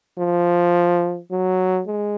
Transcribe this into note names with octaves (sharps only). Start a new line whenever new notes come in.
F3
F#3
G#3